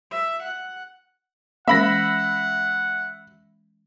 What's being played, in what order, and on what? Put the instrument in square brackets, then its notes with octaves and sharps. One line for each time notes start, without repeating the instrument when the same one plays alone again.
[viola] E5
F#5
[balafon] E3 G#3 C#4 [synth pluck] A#3 [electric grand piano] E5 B5 A#6 [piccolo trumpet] F#5